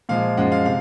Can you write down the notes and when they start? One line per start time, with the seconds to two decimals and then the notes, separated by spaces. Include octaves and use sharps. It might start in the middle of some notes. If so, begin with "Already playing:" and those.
0.09 A#2 F3 G#3 F5
0.37 F#2 F3 G#3 F#5
0.52 F5
0.66 C3 F5